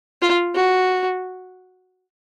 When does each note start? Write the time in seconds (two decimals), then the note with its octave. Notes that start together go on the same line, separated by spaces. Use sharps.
0.22 F4
0.55 F#4